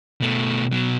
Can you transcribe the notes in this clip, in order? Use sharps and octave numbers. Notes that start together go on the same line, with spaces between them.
B2 A3
B2 F#3